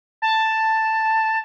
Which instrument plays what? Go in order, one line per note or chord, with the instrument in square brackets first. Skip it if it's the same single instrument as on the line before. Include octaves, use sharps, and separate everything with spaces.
[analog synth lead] A5